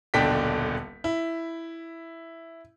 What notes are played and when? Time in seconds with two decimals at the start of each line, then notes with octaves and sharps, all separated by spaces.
0.14 D#1 B1 D3 D4 G5 B6
1.04 E4